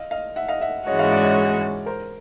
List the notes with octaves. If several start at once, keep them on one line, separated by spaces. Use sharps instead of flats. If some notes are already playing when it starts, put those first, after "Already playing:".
Already playing: D#5 F5
D#5 F5
E5 F#5
D#5 F5
E5 F#5
G#2 E3 G#3 C#4 F#4 C#5 D#5
D#5 F5
D5 E5
C#5 D#5
A#4 C5